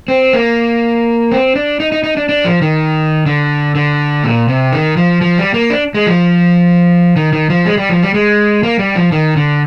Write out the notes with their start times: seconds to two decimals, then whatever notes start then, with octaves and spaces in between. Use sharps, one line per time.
0.08 C4
0.33 A#3
1.32 C4
1.56 D4
1.80 D#4
1.92 D#4
2.04 D#4
2.17 D4
2.29 D4
2.45 F3
2.62 D#3
3.26 D3
3.75 D3
4.24 A#2
4.49 C3
4.73 D#3
4.97 F3
5.21 F3
5.38 G3
5.54 A#3
5.70 D4
5.95 G#3
6.06 F3
7.16 D#3
7.33 D#3
7.50 F3
7.65 G#3
7.77 G3
7.89 F3
8.03 G3
8.14 G#3
8.63 A#3
8.79 G3
8.96 F3
9.12 D#3
9.36 D3